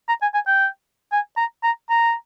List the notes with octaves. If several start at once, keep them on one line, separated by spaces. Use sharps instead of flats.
A#5
G#5
G#5
G5
G#5
A#5
A#5
A#5